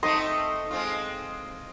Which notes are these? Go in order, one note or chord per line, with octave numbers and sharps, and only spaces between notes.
A3 C4 D#4 D#5 C6
G#3 C4 F4